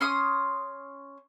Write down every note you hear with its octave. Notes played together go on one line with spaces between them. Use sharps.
C#4 C6 D#6